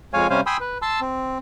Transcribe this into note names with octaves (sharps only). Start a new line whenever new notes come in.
F2 G#3 C#5 F5 G#5
C3 G3 C#4 C5 F5 G#5
G5 G#5 B5 C6 D#6 E6
B4
A5 C6 E6
C4